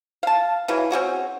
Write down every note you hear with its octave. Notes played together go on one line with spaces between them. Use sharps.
F5 A5
C#3 E3 F#3
C4 C#4 F#4 G#4